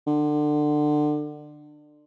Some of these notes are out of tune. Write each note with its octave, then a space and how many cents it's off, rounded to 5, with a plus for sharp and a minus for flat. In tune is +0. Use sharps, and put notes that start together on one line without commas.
D3 +25